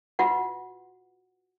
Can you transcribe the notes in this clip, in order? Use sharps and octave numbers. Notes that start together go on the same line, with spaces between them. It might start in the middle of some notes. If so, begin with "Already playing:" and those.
F4 F#4 B4 F#5